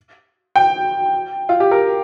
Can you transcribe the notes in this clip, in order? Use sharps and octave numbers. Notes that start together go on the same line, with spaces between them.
G5
F4
G4
A#4